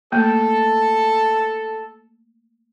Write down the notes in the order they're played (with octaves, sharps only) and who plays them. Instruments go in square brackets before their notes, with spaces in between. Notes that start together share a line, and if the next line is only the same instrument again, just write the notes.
[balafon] A3 A#3 [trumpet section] A4